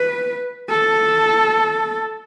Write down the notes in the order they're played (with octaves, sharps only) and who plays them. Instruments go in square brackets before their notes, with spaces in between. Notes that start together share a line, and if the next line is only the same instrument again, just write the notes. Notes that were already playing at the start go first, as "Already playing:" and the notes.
Already playing: [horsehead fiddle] B4
A4